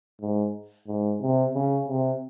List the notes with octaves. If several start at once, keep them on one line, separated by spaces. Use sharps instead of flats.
G#2
G#2
C3
C#3
C3